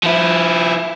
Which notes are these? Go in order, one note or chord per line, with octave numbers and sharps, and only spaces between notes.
F3 E4